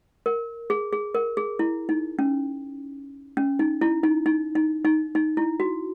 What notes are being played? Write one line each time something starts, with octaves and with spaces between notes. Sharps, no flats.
A#4
G#4
G#4
A#4
G#4
E4
D#4
C#4
C#4
D#4
E4
D#4
D#4
D#4
D#4
D#4
E4
F#4